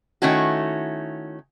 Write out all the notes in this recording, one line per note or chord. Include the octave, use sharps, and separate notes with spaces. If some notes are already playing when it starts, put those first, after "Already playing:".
D#3 A3 C#4 E4 F#4